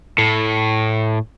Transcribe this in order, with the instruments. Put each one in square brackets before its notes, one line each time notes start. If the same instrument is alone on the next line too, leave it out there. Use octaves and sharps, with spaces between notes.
[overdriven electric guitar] A2